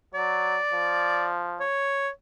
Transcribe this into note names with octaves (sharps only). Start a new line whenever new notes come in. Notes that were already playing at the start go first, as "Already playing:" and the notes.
F#3 D5
F3
C#5